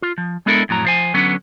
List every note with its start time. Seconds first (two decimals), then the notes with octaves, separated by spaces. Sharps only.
0.02 F4
0.18 F3
0.46 G#3 B3 D4 E4 A4 A#4
0.69 F2 A2 F#3 A#5
0.85 F3 C5 G#5
1.14 D3 F#3 B3 C#4 B4